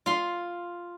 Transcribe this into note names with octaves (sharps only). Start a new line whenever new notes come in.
F4 C6